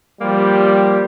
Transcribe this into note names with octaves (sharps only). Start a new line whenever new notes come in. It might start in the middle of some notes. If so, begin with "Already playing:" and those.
F3 G3 A#3 G4